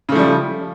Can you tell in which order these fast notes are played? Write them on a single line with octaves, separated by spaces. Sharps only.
C#3 A3 F3 G3